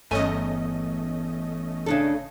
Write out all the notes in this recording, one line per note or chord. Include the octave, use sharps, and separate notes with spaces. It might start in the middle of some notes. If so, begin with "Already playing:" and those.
G1 E2 A3 C#4 D#5 G#5
C#3 D4 A4